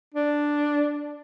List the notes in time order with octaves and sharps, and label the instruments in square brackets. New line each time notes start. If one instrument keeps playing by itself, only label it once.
[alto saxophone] D4